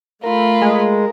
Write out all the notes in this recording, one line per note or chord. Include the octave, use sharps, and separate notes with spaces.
A3 F4 A#4 B5
G#3